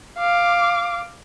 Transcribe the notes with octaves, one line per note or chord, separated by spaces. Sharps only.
F5 D6